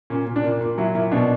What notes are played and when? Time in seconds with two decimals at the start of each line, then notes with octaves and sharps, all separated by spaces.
0.10 A#2 C#4
0.27 A#2
0.36 D4
0.44 A#2
0.61 A#2
0.78 F#3 E4
0.95 A#2 E4
1.12 B2 D4